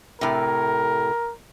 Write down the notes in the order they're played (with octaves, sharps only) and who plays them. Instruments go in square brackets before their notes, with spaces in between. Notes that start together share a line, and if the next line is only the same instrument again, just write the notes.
[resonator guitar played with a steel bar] A2 C3 [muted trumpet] A#4